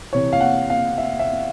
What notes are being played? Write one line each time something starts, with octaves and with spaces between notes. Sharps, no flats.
C3 E3 C#5
F5
F#5
F5
E5
E5